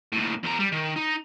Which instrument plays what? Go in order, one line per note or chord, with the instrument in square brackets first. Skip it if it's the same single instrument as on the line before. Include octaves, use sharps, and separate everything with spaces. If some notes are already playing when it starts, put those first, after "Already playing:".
[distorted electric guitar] D#2 A2
E2 A#5
G3
D#3
D#4